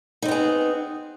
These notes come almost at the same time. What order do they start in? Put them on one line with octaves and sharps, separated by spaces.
D#4 C4 B3 G#4